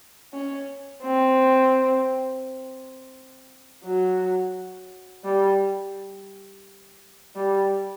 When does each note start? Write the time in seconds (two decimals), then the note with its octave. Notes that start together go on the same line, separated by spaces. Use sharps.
0.33 C#4
1.03 C4
3.84 F#3
5.24 G3
7.36 G3